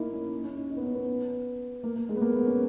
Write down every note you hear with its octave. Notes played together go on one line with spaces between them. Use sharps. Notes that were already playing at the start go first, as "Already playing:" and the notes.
Already playing: A#3 D#4 E4
C#4
C#4
D#4
D#4
B3
C#4
B3
A#3
A#3
G#3
B3
A#3
B3
C#4